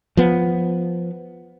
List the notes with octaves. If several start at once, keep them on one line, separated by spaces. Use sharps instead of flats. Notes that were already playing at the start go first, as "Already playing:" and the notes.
F3 B3